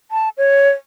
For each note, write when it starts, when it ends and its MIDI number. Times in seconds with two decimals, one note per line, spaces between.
0.11 0.29 81
0.38 0.69 73